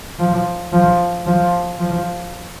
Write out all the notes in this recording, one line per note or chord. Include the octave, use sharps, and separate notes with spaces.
F3
F3
F3
F3